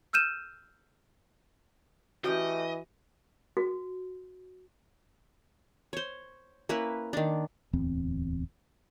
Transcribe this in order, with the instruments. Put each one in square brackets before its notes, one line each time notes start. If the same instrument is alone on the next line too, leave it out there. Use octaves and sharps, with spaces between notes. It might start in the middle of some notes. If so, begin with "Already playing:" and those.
[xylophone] E6 F6 G6 D#7 E7
[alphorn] E3 [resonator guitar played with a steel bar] A3 C#4 G4 [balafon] F#4 [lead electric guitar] D#5
[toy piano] F#4
[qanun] C5 C#5
A#3 C#4 E4 B4
D#3 D4
[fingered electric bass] D1 E2 C4